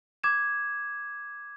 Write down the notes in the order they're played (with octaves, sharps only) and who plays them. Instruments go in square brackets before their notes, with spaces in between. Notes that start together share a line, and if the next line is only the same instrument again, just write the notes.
[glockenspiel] D6 G#6 E7